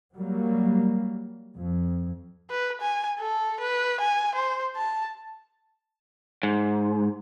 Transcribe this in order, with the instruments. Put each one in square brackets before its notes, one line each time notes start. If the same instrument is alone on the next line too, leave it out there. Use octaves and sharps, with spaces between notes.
[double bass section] F#3 G3 A#3
F2
[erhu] B4
G#5
A4
B4
G#5
C5
A5
[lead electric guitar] G#2